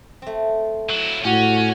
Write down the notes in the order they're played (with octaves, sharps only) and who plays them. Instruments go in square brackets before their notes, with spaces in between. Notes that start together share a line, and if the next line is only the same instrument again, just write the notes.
[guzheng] A3 C4
[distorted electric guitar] F#3 E4
[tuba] A2 [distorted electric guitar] C#4 [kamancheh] F#4 [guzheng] G4